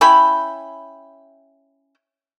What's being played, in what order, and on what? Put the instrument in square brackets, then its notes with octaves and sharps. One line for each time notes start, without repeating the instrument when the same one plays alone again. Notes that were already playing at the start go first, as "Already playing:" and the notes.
[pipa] C#4 E4 G5 B5